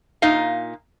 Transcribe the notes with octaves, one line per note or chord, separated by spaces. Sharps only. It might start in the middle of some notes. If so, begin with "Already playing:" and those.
A#2 D#4 D#5 F5